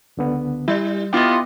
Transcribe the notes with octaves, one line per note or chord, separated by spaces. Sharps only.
C#2 D3 B3
G3 E4
B3 E4 F4 D#5 G5 D6